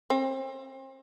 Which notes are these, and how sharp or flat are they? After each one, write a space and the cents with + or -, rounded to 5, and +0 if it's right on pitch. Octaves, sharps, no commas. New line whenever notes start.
C4 +35